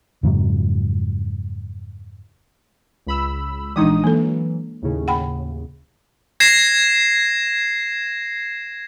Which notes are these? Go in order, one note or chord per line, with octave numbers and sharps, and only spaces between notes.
F2 G#2 C#3 F#3
C#2 B5 E6
A#1 E3 G#3 D4 D#4 D#6
E3 F#3 A#3 A4
D#2 A2 C#3
F#5 G5 B5
G#6 A#6 C7 E7